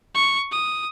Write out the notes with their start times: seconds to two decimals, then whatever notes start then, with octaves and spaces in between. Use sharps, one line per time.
0.15 C#6
0.52 D#6